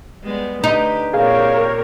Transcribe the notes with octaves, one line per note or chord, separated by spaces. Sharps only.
G3 G#3 B3
D3 D#4 G4 B4
A#2 C4 G4 G#4 A#4 C#5 F5